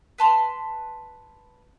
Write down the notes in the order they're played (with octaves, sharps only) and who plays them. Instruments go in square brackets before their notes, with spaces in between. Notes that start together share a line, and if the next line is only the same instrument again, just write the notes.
[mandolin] B4 A5 C6